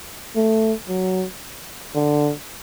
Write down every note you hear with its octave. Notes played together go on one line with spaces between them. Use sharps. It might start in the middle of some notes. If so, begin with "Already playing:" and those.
A3
F#3
D3